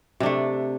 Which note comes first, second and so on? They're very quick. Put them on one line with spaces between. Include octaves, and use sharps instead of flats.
C3 D4 A3